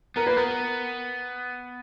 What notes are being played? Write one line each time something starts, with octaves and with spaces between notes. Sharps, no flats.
B3 A#4
A#3 B4
B3 A#4